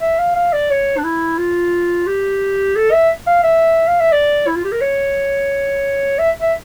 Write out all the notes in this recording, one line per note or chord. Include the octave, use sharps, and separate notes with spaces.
E5
F5
F5
D5
C#5
D4
E4
F4
G4
A4
E5
F5
E5
F5
E5
D5
E4
F4
G4
A#4
C#5
E5
E5